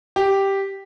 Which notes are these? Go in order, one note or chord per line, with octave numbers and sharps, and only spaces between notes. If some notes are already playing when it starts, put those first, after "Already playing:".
G4